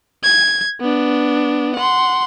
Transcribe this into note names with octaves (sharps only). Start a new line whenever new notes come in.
G#6
B3 D4
F#5 C6